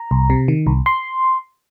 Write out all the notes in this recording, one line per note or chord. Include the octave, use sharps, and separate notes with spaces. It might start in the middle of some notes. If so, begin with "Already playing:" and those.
Already playing: A#5
C2
C3
D#3
C2
C6